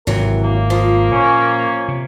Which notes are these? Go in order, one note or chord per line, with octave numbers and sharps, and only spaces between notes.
G#1 C3 E3 F#3 A#4
A#3
F3
A#2 C#4
C3